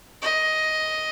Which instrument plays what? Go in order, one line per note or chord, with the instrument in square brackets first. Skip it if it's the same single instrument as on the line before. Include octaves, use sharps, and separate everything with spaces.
[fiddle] D#5